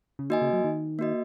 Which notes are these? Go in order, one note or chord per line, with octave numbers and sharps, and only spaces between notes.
C#3
D#3 A#3 F#4 D#5 G#5
C#3
F#3
D#3
A#3 F#4 D#5